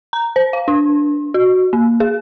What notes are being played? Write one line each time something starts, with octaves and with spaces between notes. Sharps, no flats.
A#5
C5
F5
D4
F#4
A#3
G#4